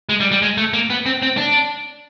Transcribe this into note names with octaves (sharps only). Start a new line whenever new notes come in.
G#3
G3
G3
G#3
A3
A#3
B3
C4
C4
D4